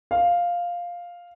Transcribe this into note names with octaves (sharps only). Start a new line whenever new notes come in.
F5